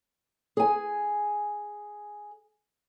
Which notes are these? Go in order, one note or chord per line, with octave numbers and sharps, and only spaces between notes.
G#4 G#5